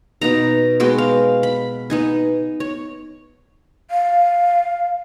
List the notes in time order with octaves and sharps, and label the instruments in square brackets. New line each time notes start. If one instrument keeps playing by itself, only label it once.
[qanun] B2 B3 D#4 A#5
G#3 B3 F#4 G5
F5
B5
B3 D#4 G#5
C#5
[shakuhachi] F5